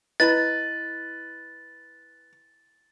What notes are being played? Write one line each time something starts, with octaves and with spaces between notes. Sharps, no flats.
E4 B4 D#5 A6